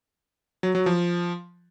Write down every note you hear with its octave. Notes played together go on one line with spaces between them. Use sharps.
F#3
F#3
F3